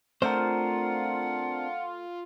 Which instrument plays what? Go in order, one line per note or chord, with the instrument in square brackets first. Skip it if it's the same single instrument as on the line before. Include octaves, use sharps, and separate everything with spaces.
[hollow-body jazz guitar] A3 C5 [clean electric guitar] C4 D4 A#4 [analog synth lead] F4 [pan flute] F#5